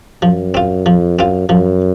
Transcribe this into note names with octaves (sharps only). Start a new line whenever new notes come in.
F#2 F3
C4 F4
F2 F3
F#2 C4 F4
F#2 F3